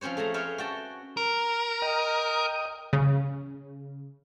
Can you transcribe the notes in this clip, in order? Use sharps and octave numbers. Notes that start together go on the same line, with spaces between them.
F3 C4 C#4 C5 C#5
A3 G#4 A5 A#5
G#4 B4 C#5 E5 F5 G5
F#4 G5 A5
A#4
D#5 G5 D#6
C#3